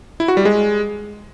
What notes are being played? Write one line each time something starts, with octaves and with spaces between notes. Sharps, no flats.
E4
F#4
G3
G#3